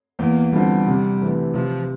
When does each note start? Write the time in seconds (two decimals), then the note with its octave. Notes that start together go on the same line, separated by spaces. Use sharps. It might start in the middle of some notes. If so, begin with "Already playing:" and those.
0.19 E2 A#3
0.53 D3 F3 G3 C4
0.86 C3
1.21 E3 A3
1.54 C3 F3